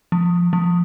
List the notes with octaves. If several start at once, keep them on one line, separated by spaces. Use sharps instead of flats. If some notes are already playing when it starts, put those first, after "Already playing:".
F3
F3